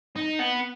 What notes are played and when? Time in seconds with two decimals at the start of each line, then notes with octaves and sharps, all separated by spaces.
0.16 D#4
0.40 B3